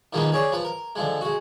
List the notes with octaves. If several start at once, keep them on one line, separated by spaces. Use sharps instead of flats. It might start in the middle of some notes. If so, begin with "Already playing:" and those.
D#3 F3 G#3 A#3 B3 D#4
G#4 C#5 D5
F3 B4
A#4
D3 F3 G#3
G#3 F#4